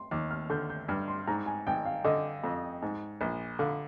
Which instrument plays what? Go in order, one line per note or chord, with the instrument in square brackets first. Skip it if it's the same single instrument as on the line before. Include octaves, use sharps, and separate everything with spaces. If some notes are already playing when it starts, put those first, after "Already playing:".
Already playing: [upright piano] C6
[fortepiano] D#2 [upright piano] D6
[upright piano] F6
[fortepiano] D3 [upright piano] G6
[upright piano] G6
[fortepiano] G2 [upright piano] F6
[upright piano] C6
[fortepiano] G#2 [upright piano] A#5
[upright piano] G#5
[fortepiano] G#1 [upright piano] G5
[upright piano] F5
[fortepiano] D3 [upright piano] D#5
[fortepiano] F2
G#2
A#1
[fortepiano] D3 [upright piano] F5